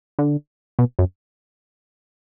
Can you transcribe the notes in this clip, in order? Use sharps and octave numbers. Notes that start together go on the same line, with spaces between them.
D3
B2
F#2